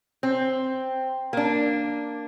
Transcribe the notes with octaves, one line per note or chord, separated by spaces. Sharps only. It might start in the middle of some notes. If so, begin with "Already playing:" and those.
C4
A#3 D4